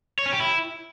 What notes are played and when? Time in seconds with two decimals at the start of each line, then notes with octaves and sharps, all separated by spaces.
0.19 C#5
0.26 C#4
0.33 G4
0.40 E4